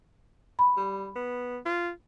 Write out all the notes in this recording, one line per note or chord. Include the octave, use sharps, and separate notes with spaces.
B5
G3
B3
F4